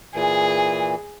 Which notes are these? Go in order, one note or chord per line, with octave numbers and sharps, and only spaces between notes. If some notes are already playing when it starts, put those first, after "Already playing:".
A#2 E3 G#4